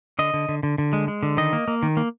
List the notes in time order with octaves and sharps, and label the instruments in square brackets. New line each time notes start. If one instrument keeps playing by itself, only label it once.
[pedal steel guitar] D3 D#5
D3
D3
D3
D3
G#3
G#3
D3
D#3 D#5
A#3
A#3
D#3
A#3